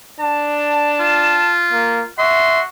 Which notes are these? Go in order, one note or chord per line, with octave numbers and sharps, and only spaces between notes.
D4 A5
F4
A#3
F#4 E5 C6